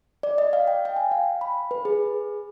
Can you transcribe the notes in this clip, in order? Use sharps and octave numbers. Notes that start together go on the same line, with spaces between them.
D5
D#5
F5
G5
G5
G#5
F5
B5
B4
G#4